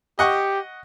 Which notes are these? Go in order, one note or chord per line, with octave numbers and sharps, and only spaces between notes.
G4 D#5 F#5 C#6